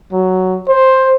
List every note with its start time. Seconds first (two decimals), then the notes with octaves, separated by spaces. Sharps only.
0.12 F#3
0.68 C5